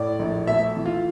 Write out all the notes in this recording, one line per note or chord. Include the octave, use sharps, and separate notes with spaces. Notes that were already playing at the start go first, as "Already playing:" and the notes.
Already playing: A2 D5
A#1
A3 E5
E3
F4